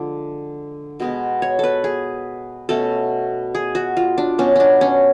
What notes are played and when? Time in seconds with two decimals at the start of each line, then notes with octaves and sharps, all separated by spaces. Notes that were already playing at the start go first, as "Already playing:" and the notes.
Already playing: D3 F3 G#3
1.00 B2 G#3 B3
1.42 C#5
1.59 A4 B4
1.84 G#4
2.69 B2 A3 C#4 A4
3.55 G#4
3.75 F#4
3.97 F4
4.18 D4
4.38 B2 F#3 B3 C#4
4.56 C#4 D4
4.81 C#4